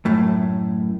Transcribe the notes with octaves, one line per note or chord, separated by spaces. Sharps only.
F#2 A2